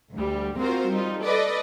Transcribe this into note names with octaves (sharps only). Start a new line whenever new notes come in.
D2 G3
A#3 C4 F4 F#4 A#4 C5
G3 D#4 F4
A4 B4 D5 D#5